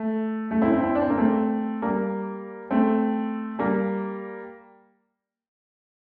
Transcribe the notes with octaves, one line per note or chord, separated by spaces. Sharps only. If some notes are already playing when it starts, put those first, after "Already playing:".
Already playing: A3
A3
C4 E4
C4 E4
C4 E4
D4
C4
A#3
A3 C4
G3 A#3
A3 C4
G3 A#3